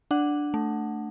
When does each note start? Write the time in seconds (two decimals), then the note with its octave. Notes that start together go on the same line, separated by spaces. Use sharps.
0.11 D4 F#5
0.54 A3